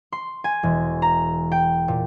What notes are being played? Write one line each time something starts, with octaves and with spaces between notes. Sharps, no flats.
C6
G#5
E1
A#5
G5
A#2